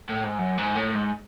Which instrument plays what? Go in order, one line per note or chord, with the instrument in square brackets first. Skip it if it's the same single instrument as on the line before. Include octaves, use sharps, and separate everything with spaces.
[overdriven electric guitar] A2
G#2
F#2
G#2
A2
G#2